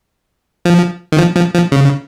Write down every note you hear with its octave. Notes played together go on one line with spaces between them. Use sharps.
F3
D#3
F3
F3
F3
C#3